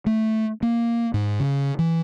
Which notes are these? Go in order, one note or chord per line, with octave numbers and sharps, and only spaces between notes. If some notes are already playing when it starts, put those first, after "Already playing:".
A3
A#3
G#2
C#3
E3